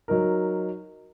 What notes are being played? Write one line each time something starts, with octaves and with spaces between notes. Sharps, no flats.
F#3 D#4 A#4